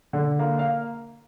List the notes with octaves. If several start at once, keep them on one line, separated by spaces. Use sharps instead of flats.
D3
A#3
F5